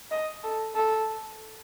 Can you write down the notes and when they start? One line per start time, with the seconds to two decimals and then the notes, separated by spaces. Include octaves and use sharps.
0.11 D#5
0.43 A4
0.75 A4